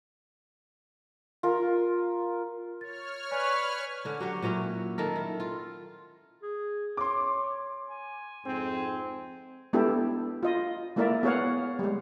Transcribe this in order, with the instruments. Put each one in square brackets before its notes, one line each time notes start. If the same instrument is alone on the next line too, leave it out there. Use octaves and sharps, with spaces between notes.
[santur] F4 A#4
[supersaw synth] C#5 F6 [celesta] A6
[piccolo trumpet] B4 [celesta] D5 G#5 C#6
[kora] D3 C#4
F#3 G4 C#5
A#2 F#3 C#4 E4
D#3 A4 A#4
E4
F4
[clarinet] G#4
[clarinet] C#5 [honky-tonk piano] C6 D6
[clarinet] G#5
[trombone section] F2 G#2 C4
[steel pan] G#3 B3 D4 E4 G4 A4
F4 D#5
G#3 A#3 E4 A#4 D5 E5
B3 G#4 C#5 F5 F#5
G3 G#3